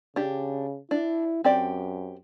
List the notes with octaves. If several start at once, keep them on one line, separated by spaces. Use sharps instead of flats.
C#3 D4 G4
D4 E4
F#2 C4 G4 D5